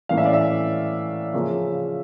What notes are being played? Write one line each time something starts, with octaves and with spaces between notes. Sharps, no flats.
A2 E3 A#3 C#4 F5
E5
D5
E5
C#3 F3 A#3 C#4